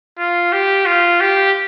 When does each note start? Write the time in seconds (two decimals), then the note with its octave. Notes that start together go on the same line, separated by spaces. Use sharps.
0.18 F4
0.53 G4
0.86 F4
1.21 G4